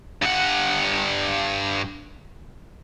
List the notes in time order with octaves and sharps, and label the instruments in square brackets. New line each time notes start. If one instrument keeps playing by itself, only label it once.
[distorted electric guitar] G2 F#5